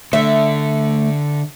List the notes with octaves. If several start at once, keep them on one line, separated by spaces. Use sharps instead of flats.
D3 A3 E5